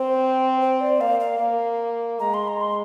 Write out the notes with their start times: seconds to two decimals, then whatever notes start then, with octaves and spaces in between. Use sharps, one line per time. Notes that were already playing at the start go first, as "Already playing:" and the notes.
Already playing: C4 C5
0.61 C5
0.81 D5
1.00 A#3 F5
1.20 F5
1.40 A#3
2.20 G#3 A#5
2.34 C6
2.48 A#5
2.61 C6